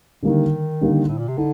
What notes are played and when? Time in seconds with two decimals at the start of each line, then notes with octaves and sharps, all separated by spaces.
0.23 D3 D#3 G3 A#3 D#4
0.81 D3 G3 A#3 D#4
1.08 A2
1.18 A#2
1.28 C3
1.38 D3 D#4